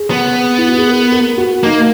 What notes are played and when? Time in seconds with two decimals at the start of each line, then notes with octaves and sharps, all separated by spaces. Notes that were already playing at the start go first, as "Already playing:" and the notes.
Already playing: G#4
0.10 B3
0.58 E4
0.68 F#4
0.78 G#4
0.87 A#4
1.12 A#4
1.38 F#4
1.64 A#3 D#4